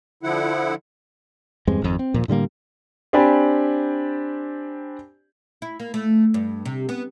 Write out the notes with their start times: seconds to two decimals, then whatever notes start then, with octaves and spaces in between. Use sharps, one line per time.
0.23 D3 F3 E4 F#5
1.67 E2 G2 G#3 C4
1.82 G#1 F2
1.99 C4
2.14 D#1 A#2 F3
2.28 A2 D3 G3 A#3
3.13 C4 D4 G4 D5 G#5 B5
5.62 E4
5.80 A#3
5.94 A3
6.34 G2
6.65 C3
6.89 B3